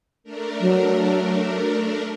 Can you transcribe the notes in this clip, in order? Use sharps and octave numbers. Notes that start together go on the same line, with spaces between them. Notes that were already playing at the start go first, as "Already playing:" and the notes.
A3 D4 A#4
F#3